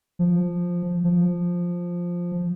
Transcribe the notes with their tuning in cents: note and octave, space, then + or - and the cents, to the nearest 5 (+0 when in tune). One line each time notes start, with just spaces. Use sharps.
F3 +5
F3 +5